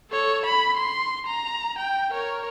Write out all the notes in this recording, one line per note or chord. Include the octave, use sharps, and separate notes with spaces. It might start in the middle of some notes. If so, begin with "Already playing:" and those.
A4 C#5
B5
C6
A#5
G5
A#4 C#5